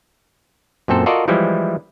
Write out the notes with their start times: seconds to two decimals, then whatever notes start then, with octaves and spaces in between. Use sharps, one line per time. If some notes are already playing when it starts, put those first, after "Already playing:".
0.88 F#2 A#2 C4 A4 C5
1.06 F4 F#4 A4 A#4 D5 D#5
1.28 E3 F3 G3 G#3 E4